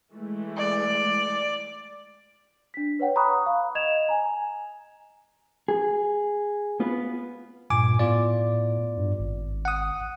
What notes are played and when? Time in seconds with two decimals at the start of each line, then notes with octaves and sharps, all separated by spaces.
0.14 E3 G#3 A3
0.57 D5
2.74 D4 B6
2.99 B4 C#5 F#5 G5
3.16 A#5 B5 C#6 D#6 F#6
3.46 F5
3.75 D#5 G#6 E7 F7
4.09 G#5 A#5
5.68 G#4
6.80 B3 F4 B4
7.70 G2 A#2 G#5 D6
7.99 A2 B3 F4 D5
8.97 G2
9.19 G#1
9.65 F#5 D#6